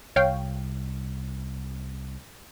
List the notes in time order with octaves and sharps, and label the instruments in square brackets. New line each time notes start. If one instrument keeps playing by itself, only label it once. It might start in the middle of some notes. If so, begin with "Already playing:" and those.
[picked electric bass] C2 [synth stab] C#5 F5 G5